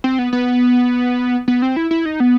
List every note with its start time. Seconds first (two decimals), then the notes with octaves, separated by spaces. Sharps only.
0.04 C4
0.19 B3
0.33 B3
1.48 B3
1.62 C4
1.76 E4
1.91 E4
2.06 D#4
2.20 B3